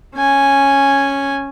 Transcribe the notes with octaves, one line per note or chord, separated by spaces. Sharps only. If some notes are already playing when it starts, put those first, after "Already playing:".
C#4 G#5